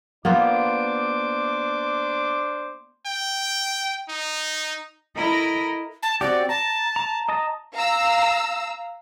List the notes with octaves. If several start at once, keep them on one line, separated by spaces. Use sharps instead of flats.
A#3 B3 D4 F4 C5 D6
G5
D#4
E4 A4 A#4 D#5 A#5 B5
A5
C4 F#4 G4 D5
A5 A#5
A#5
D#5 A5 A#5
F5 A#5 E6